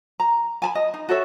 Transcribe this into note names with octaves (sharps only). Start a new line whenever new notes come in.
A#5
G#5 A5 B5
D#5
D#4
F#4 A4 C#5 E5